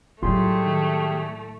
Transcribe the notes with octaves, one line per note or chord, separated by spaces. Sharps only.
A2 F#3 G3 A3 F4 G4 G#4 C6
D#3